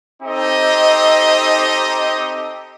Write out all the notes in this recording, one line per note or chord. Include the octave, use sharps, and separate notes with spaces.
C4 D#4 G4 A4 D#5